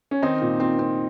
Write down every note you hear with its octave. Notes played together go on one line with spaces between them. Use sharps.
C#4
D#3 C4 D#4
A#2
C4
C4